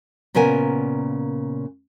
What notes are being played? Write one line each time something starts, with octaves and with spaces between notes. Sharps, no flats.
A#2 C#3 B3 A#4 G#5